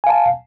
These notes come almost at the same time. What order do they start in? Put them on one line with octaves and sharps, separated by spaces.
G#5 F5 A5